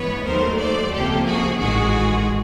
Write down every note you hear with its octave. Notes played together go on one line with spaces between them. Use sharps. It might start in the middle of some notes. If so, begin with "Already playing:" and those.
Already playing: G2 E3 G#3 B3 B4 C#5
D#2 D#3 F#3 A3 A#4 C5
C5 D5
C#2 C3 F3 A#3 G4 A4
F#4 G#4
A1 G#2 D#3 G#3 F#4 G#4